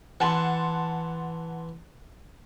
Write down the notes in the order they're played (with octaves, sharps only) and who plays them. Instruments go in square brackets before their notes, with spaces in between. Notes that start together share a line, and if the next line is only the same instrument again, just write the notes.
[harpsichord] E3 [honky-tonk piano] F#5 A5 C6